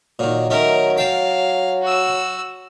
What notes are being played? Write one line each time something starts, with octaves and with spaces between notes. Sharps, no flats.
A#2 D#3 F#3
D#3 A3 C#4 A#4
F5 G5 A5
F#4 E6